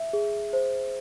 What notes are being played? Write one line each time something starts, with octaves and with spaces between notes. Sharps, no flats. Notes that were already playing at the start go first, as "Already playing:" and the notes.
Already playing: E5
G#4
C5